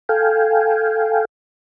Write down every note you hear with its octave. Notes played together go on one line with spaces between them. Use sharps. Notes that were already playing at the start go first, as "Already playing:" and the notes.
A4 F5 G5 G#5